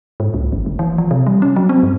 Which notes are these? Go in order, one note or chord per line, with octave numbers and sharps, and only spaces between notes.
G#2
C#2
G#1
F1
E3
F3
C3
G3
C#4
F#3
C4
G2